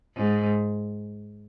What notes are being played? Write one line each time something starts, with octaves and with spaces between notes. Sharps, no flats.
G#2